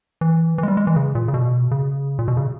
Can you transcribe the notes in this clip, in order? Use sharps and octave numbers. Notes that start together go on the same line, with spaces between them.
E3
E3
G#3
G3
G#3
E3
C#3
A#2
C#3
B2
C#3
A#2
B2
C#3